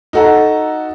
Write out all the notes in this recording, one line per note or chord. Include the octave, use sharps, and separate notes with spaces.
D#4 F#4 A4 F#5 A#5